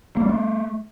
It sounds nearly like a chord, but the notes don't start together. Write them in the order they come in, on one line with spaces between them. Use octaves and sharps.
A#3 G3 C4 A3